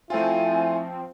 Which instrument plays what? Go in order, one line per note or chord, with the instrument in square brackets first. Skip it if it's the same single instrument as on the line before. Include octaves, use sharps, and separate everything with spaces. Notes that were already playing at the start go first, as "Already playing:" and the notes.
[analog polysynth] F3 C4 [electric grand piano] A3 F4 [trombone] E4 [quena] G#5